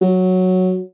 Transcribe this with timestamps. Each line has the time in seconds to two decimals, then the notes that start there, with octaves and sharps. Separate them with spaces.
0.02 F#3